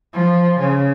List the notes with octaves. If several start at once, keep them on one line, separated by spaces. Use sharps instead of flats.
F3
C#3